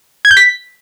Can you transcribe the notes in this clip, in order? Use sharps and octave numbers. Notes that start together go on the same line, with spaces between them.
G#6
G6
B6